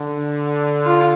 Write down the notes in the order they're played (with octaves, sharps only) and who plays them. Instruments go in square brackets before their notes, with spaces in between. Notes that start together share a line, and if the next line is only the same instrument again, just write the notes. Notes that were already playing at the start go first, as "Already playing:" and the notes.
Already playing: [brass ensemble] D3
[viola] F4